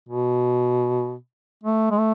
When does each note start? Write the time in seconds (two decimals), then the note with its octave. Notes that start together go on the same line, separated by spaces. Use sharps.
0.09 B2
1.64 A3
1.91 G#3
1.98 A3